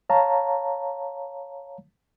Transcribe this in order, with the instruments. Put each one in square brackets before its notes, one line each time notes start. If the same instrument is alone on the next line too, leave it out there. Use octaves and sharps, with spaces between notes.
[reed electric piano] C#5 F5 A5 A#5